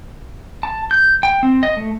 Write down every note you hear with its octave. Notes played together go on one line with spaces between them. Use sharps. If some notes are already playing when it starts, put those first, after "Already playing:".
A5
G6
G5
C4
D#5
A3